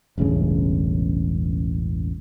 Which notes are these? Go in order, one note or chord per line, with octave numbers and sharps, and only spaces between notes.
E1 A1 G2 C#3